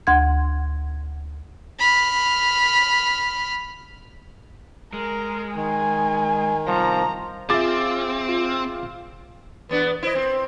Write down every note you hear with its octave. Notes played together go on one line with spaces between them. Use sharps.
D2 F#5 C6 G#6
B5 F6
G#3 A#4
D#3 G#5
C3 F3 G3 A#5
C4 F4 G#4 E5 D6 A6
F4
E2 B3 D4 B4
E4 C5 D#5
C4